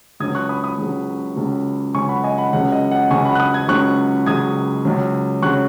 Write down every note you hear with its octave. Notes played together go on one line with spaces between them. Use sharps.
C#2 C#3 F#3 D#6 G#6
C#6 F#6
B5 D#6
B5 D#6
C#2 C#3 F#3
C#2 C#3 F#3
C#2 C#3 F#3 G#5 C#6
F#5 B5
D#5 G#5
F#5 B5
C#2 C#3 F#3 F#5
D#5
F#5
C#2 C#3 F#3 G#5 C#6
F#5 B5
F#6
B5 D#6
D#6 G#6
C#2 C#3 F#3 C#6 F#6
C#2 C#3 F#3 D#6 G#6
C#2 C#3 F#3
C#3 F#3 C#6 F#6